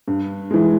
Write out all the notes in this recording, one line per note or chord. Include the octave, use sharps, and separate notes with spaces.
G2
E3 G#3